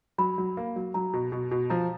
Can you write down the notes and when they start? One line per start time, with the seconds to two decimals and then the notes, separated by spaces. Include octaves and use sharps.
0.18 F#3 B5
0.38 F#3
0.57 A#3
0.76 F#3
0.94 F#3 A#5
1.13 B2
1.32 B2
1.51 B2
1.70 F3 A#5